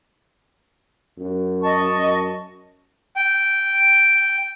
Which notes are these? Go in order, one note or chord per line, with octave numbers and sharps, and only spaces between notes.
F#2
D#5 A5 C#6
F#2
G5